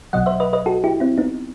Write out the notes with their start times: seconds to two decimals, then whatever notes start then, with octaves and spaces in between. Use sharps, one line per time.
0.13 B1 B2 F#3 D#5 F#5
0.26 C5 E5
0.40 B4 D#5
0.53 B4 D#5
0.66 F#4 A4
0.84 E4 G4
1.00 C4 E4
1.18 B3 D#4